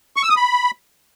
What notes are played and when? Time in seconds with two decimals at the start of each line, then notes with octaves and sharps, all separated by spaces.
0.16 C#6
0.23 E6
0.30 D#6
0.36 B5